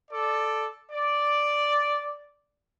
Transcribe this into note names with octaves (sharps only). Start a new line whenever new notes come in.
A4 D5
D5